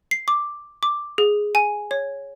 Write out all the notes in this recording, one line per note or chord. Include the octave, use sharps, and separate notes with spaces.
C7
D6
D6
G#4
G#5
C#5